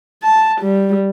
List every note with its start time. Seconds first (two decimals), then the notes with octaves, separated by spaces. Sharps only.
0.23 A5
0.61 G3